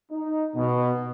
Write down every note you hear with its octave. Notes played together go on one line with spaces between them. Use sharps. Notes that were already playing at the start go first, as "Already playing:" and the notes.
D#4
B2